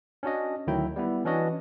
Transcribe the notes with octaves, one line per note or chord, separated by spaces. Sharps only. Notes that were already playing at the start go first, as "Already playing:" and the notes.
C#4 D4 F#4 D#5
D2 D#3 F#3 E4 G5
G3 B3 E4
E3 C#4 D4 F#4 D#5